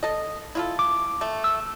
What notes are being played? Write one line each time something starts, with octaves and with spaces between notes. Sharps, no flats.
A4 D#5
E4 F4 A4
D6
A3
E6